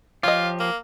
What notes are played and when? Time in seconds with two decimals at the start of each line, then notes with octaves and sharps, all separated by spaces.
0.23 F3 F4 G4 C#5 D#5
0.59 A#3